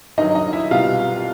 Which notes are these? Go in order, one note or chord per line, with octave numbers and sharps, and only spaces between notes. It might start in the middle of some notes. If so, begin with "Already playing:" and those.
G2 D#3 F#3 D#4 D#5
D#4 D#5
E4 E5
C2 B2 G3 F4 F5